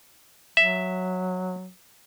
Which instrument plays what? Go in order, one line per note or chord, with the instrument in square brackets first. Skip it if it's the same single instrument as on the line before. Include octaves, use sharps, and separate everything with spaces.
[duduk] F#3 [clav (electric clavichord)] E5